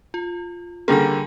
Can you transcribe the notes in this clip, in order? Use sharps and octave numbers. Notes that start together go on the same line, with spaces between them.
F4
D3 G3 A#3 G#4 G#5